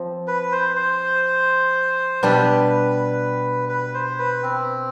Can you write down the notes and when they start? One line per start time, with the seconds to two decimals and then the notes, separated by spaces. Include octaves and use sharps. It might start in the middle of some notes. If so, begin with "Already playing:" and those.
Already playing: F3 C4
0.28 B4
0.52 C5
0.76 C5
2.22 B2 G3 D4 G4 B4
3.69 B4
3.94 C5
4.19 B4
4.43 C4